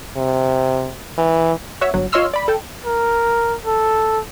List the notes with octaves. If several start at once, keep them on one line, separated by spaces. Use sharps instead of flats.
C3
E3
F#4 C#5 E5
G1 F#3
F4 C#5 D#5 C6 E6 F6
D5 B5
A4 G5
A#4
A4